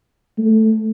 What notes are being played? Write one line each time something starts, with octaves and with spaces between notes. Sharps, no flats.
A3